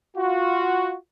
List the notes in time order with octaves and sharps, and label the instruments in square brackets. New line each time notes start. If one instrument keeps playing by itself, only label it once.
[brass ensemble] F4 F#4